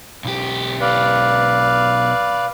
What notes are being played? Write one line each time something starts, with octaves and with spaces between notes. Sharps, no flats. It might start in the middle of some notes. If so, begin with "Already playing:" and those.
B1 G4
B4 D5 F5